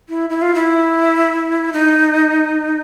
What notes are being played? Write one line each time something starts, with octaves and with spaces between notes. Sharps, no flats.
E4
E4
F4
E4
D#4